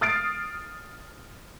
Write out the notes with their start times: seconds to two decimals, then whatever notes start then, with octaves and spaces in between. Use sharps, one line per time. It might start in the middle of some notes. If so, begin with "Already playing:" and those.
0.01 D#6 F6 A6 C7 D7